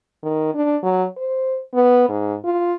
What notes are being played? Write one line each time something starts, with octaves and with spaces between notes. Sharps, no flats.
D#3
D4
F#3
C5
B3
G#2
F4